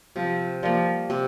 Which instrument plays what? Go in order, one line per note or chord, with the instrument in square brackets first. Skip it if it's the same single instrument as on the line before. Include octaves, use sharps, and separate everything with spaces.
[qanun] C3 [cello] F3
[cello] F3 [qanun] G3 A#3
[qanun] C3